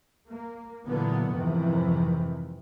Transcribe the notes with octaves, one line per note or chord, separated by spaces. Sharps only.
A#3
A#2 D3 E3 F#3 A#3 B3
F2 G#2 C3 D#3 E3